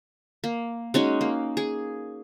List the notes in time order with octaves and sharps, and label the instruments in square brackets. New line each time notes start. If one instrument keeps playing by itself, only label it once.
[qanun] A#3
G#3 C#4 D#4 F#4
A#3
G#4